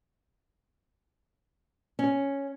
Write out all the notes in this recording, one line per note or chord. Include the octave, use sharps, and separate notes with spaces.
C#4